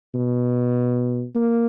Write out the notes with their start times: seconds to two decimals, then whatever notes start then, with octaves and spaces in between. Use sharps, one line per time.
0.15 B2
1.36 A#3